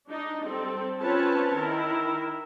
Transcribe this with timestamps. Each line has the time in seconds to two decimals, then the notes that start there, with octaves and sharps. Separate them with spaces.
0.10 D4 D#4 D#5
0.45 G3 C4 A4
0.98 C4 C#4 F4 B4 C#5 A5
1.55 D#3 E4 A#4